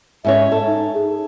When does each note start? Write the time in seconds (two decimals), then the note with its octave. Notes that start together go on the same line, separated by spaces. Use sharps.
0.25 G#2 C#4 C#5 E5
0.52 A4
0.67 D#4
0.94 G#4